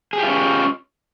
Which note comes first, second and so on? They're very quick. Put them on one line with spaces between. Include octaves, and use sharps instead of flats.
G#4 G4 F4 C#4